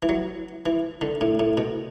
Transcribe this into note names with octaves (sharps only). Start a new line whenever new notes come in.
E3
F#3
E3
D3
A2
A2
B2